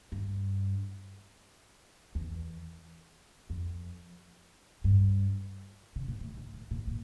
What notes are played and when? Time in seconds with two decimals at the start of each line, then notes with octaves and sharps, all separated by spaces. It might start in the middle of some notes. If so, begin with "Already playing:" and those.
0.12 G2
2.15 E2
3.50 F2
4.84 G2
5.96 C#3
6.08 A#2
6.21 A2
6.37 G2
6.54 A2
6.71 A#2
6.88 A#2